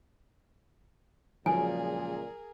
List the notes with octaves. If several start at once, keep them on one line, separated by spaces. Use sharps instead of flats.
C#2 A#2 F3 F#3 G#4 A#4 G#5